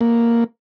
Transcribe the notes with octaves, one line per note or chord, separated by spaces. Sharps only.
A#3